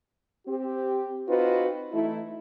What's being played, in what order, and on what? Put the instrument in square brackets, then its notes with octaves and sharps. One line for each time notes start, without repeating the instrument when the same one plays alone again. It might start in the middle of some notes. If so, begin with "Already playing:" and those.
[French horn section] C4 G4
C4 D#4 F4 F#4 B4
E3 A3 D#4 E4